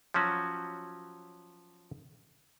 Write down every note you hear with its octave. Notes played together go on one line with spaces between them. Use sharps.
F3 F#3 C#4 F#4